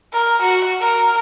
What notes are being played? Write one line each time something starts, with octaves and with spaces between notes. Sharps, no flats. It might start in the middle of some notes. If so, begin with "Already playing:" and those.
A#4
F#4
A#4